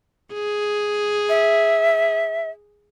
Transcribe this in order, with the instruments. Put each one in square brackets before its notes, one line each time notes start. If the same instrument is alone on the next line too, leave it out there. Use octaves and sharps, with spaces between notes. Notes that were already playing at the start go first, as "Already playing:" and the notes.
[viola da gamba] G#4
[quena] E5